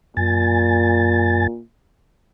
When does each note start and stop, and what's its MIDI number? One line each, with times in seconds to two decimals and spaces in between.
0.17 1.47 42
0.17 1.60 46
0.17 1.47 80
0.17 1.47 93